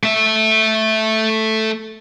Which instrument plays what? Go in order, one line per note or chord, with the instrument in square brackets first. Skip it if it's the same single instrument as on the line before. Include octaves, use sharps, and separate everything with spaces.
[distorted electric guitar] A3 E5